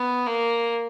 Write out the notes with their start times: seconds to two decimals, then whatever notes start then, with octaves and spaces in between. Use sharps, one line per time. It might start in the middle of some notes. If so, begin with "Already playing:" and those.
Already playing: B3
0.26 A#3